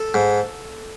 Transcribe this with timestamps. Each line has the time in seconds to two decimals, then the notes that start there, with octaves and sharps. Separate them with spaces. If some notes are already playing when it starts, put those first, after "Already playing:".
Already playing: A4
0.14 G#2